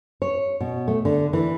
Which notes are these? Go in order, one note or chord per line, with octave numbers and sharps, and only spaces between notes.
C#5
B2
A3
D3
E3